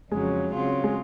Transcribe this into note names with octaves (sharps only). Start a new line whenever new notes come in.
F2 C#3 F#3 G#3 C#4
C#3 F#3 C4 F4
G#3